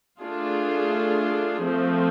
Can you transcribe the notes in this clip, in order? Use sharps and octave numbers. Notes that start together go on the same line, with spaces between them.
A3 D4 F4 G#4
F3 A3 C4